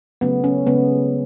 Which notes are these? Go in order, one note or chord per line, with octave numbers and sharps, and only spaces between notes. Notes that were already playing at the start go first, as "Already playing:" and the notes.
C#3 F#3 A3 B3
C#4
C#3 G#3 B3